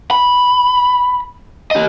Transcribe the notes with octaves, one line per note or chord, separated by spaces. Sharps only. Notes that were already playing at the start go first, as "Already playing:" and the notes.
B5
G4 D#5